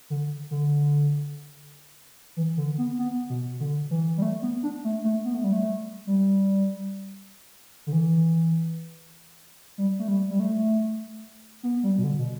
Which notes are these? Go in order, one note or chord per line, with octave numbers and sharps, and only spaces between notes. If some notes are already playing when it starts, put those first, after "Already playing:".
D3
D3
E3
D3
B3
B3
B2
D3
E3
G3
A3
B3
D4
A3
A3
B3
A3
G3
A3
G3
D3
E3
G3
A3
G3
G3
A3
B3
G3
B2
D3
B2